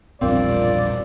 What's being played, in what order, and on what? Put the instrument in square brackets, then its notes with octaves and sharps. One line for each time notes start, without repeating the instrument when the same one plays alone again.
[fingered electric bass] E1 A#1 G2 [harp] C4 [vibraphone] F4 A#4 F5 [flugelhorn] D5